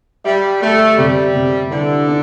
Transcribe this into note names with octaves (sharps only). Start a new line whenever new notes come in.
G3 E5
A3 G4
C3 G3
C3
D3 E3
D4